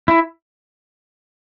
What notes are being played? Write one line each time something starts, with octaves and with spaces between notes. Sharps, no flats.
E4